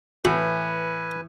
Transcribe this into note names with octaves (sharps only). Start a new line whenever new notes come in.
A2 E3 F#4 B4 G#5